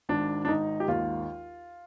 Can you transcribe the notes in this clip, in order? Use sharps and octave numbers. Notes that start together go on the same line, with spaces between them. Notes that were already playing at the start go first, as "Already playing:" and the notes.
G#1 D4
D4
G#1 D#4
G4
D#2 F4